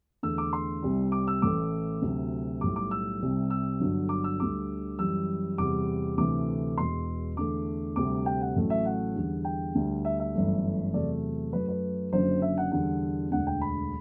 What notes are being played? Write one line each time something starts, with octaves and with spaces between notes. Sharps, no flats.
E2 D3 A3 E6
D6
C6
C2 C3 G3
D6
E6
A1 A2 E3 A3 D6
D2 C3 F#3
B1 A2 G3 D6
D6
E6
C2 C3 G3
E6
G1 G2 D3 F#3
D6
E6
D2 D3 G3 D6
F#2 E3 G3 E6
E2 C3 G3 D6
D2 C3 E3 A3 D6
E1 E2 B2 C6
E2 D3 A3 D6
D2 C3 G3 D6
G5
F#5
A1 A2 F#3 A3
E5
F#5
E2 D3 G3
G5
D2 D3 G3
E5
E5
G1 F#2 E3 A3
E2 C3 F#3 A3 D5
F#2 F#3 A3 B4
B4
F#1 F#2 D3 F#3 C5
E5
F#5
E2 D3 G3 F#5
E1 D2 D3 F#5
G5
B5